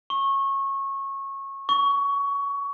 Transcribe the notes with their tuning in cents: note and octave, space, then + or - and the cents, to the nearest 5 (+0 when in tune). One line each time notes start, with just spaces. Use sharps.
C#6 -20
C#6 +20